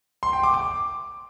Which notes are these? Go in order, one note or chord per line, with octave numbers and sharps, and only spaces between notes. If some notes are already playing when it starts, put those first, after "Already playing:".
C6
G5
D6
D6